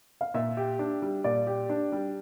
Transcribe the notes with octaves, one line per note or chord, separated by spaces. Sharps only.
F5
A#2 E5
G4
D4
G3
A#2 D5
G4
D4
G3